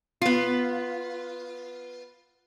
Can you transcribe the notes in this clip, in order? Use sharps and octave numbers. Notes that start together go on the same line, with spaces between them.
B3 F4